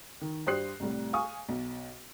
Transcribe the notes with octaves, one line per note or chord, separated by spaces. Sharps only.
D#3
G2 G4 C5 D#6 F#6 C7
C2 A2 G3
F5 G#5 C#6 D#6
B1